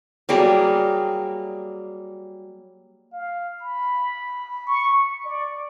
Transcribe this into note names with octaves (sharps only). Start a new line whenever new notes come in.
F#3 G3 A#3 G#4
F5
B5
C#6
D5